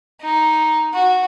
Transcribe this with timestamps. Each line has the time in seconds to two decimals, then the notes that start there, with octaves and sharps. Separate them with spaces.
0.21 D#4
0.94 F#4